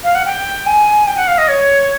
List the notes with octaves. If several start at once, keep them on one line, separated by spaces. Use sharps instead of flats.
F5
F#5
G5
G#5
G5
F#5
F5
D#5
C#5